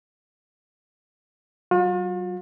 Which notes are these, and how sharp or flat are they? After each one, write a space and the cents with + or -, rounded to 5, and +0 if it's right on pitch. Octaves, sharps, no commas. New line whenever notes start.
F#3 +30 F4 +45